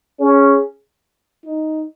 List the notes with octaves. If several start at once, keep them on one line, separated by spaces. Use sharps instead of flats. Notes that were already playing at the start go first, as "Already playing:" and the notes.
C#4 G#4
D#4